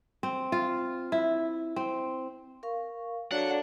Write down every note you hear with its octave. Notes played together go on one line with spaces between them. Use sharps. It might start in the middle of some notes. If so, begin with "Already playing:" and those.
C4
F4
E4
C4
A#4 F5 C#6
F#3 D4 A4 F5 F#5